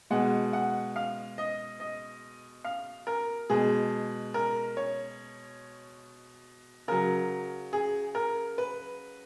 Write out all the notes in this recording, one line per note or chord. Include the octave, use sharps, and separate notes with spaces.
B2 G#3 F#5
F#5
F5
D#5
D#5
F5
A#4
B2 G#3 G#4
A#4
C#5
C#3 F#3 A#4
G#4
A#4
B4